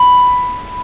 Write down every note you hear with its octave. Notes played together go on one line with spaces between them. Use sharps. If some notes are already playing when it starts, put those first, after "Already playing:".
Already playing: B5